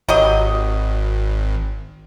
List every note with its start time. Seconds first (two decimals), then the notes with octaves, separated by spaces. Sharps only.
0.08 G#1 F#3 G4 D#5